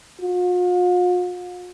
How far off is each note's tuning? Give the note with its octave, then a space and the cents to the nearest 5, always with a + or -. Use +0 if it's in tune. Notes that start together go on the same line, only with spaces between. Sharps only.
F4 +45